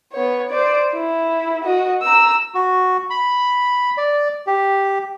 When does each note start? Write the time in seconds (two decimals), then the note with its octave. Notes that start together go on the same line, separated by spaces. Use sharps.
0.12 B3 C#5
0.50 C5 D5
0.94 E4
1.64 F#4 D#5
2.02 A#5 E6
2.54 F#4
3.10 B5
3.97 D5
4.47 G4